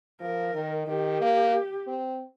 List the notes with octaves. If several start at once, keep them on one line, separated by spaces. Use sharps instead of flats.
F3 A#4
D#3
D#3 G4
A#3
C4